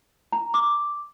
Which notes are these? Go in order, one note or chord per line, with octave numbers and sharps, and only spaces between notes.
A#5
D6